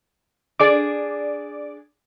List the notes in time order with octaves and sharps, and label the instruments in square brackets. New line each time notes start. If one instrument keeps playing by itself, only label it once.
[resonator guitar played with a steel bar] D4 G#4 [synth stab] D5 D6